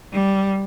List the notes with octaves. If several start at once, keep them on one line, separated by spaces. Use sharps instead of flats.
G3